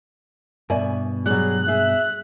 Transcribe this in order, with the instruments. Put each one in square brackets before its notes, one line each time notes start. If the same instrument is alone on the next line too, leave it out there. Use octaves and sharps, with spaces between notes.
[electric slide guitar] G2 B2 [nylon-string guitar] D5 E5 G#5
[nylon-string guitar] F#3 G3 [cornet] G#4 [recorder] F#6
[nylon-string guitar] G#4 [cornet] E5